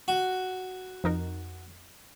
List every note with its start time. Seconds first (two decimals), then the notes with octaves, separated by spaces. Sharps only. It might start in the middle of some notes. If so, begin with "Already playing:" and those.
0.08 F#4
1.04 F2 D#4 A#4